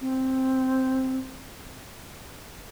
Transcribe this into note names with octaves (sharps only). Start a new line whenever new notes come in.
C4